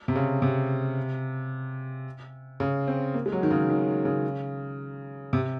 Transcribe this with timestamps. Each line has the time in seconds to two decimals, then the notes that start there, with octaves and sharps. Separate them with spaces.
0.08 C3
0.15 C#3
0.42 C3
2.60 C#3
2.88 C4
3.14 A#3
3.26 G#3
3.32 F#3
3.43 D#3
3.51 C#3
3.70 D#3
4.05 C#3
5.33 C3